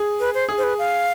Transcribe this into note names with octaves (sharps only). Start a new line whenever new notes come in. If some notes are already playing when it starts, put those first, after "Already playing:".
Already playing: G#4
B4
C5
G#4
C5
B4
F5